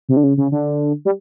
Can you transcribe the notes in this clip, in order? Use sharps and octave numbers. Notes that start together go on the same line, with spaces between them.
C3
D3
C#3
C#3
D3
G3